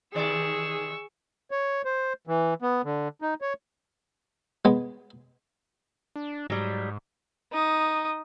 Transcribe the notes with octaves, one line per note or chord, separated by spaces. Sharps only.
C3 D#3 G#4 D5 C#6 E6
C#5
C5
E3
B3
D3
D#4
C#5
G#3 B3
D4
G#2 F#3 G3
D#4 D#6